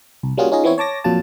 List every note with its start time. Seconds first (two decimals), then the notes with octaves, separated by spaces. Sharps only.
0.23 C2
0.37 G3 A#3 C#4 F4 F#4 G#4
0.52 C#4 D#4 F4 G#4 D#5
0.64 E3 B3 C4 E4 C#5
0.78 C#5 A5 D6 A#6
1.04 F2 A#2 F#3 F4 A5